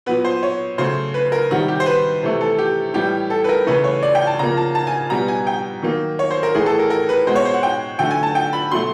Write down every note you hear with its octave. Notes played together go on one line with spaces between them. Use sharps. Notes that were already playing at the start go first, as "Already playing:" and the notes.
A#2 F#3 B3 B4
C5
C#5
C#3 F#3 A3 C5
B4
A#4
C3 D#3 G3 F#4
G4
C5
B4
C3 E3 A3
A4
G4
A2 E3 G3 G4
A4
B4
A#4
C#3 E3 A3 B4
C#5
D5
G5
A5
C#3 F3 A#3 A#5
A5
A5
G#5
B2 G3 B3 A#5
G#5
G5
D#3 F#3 A#3
C#5
C5
A#4
A2 E3 A3 G#4
A4
A#4
A#4
B4
B2 G#3 B3 C5
C#5
C5
F#5
G5
D3 F#3 A3 G5
G#5
A5
G5
B5
B2 F#3 A3 C6